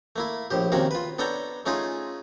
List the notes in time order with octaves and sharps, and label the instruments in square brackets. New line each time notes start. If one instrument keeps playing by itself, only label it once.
[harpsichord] A3 A#3 E4
A#1 A2 G4
C3 D#3 A#3 C#4 F#4
F4 B4
B3 D4 A4 C#5 G5 A#5
A3 C#4 D#4 F4 G#4